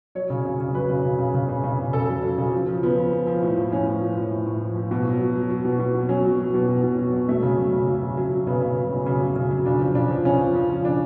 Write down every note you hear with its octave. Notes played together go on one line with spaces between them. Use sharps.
F#3 C#5
C#3
C#3
C#3
F#3 B4
C#3
C#3
C#3
C#3
C#3
C#3
C#3
C#3 A4
F#3
F#3
C#3
F3
F3
F3 B3
F3
F3
F3
A2
F3
A2 C#4
F3
F3
F3
A2
A2
F3
F3
B2
F#3
F#3
F#3
F#3
B2
B2
B2
F#3 C#4
F#3
F#3
B2
B2
B2
F#3
F#3
F#3 A3
C#3
F#3
C#3
F#3
C#3
F#3
F#3
C#3 B3
C#3
F#3
C#3
C#3
F#3
C#3
F#3
C#3 D4
F3
C#3 D4
F3
C#3 C#4
F3
F3
F3
C#3 D4